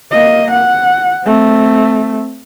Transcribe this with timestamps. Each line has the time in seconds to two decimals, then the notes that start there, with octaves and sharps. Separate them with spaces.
0.12 A#3 D#5
0.51 F#5
1.24 A3 C4